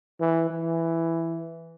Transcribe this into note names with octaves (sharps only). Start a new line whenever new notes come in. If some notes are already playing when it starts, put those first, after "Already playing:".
E3
E3